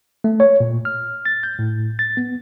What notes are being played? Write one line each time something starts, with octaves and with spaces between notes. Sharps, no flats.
A3
C#5
A#2
F6
A6
G6
A2
A6
B3